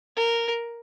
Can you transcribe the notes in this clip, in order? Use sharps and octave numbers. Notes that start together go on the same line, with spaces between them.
A#4